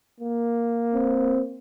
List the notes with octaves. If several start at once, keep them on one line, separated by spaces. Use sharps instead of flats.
A#3
C4